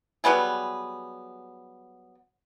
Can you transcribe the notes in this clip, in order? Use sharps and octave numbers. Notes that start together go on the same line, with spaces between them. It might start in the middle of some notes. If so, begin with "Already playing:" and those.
F#3 G3 B3 G#4